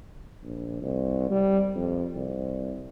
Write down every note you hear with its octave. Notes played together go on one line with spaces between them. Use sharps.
A#1
C2
G3
F2
C2